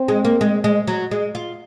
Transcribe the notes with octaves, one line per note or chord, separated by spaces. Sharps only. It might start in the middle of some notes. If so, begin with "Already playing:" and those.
Already playing: C4
G#3
A#3
G#3
G#3
F#3
G#3
F4